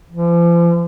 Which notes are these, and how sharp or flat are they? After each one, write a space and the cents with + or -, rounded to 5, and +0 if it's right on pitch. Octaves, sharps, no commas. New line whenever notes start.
F3 -40